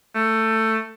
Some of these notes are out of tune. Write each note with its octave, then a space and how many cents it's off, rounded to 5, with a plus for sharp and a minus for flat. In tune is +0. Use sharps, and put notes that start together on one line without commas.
A3 +15